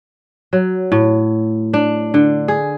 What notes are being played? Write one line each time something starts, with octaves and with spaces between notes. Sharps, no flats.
F#3
A2
D4
D3
G#4